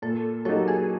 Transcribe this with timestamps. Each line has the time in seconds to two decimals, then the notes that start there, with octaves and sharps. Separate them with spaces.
0.02 A#2 A4
0.45 F#3 A#3 D#4 G4 A4
0.68 G#4